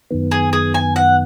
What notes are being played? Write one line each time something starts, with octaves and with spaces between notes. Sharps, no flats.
F#2 D#3 B3
G#4
G#4
G#5
F#5